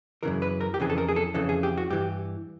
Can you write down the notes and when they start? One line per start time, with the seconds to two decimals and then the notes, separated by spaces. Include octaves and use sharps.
0.23 F#2 C#3 E3 A#4
0.42 B4
0.61 A#4
0.74 G4
0.80 F2 C#3 E3 G#4
0.90 A4
0.98 A#4
1.08 G#4
1.16 A4
1.35 F2 C#3 E3 A4
1.49 G#4
1.63 G4
1.77 F#4
1.90 G2 E3 G4